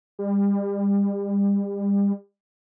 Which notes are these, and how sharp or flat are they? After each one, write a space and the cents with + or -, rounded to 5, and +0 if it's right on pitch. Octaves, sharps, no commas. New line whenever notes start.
G3 +35